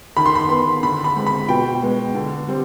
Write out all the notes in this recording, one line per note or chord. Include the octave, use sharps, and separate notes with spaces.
D#3 B5
C6
B5
B3 C6
D3 B5
B5
G#3 C4
B5
B2 G5
G#3 B3
D3
G3 C4